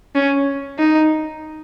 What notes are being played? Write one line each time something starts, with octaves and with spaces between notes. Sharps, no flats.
C#4
D#4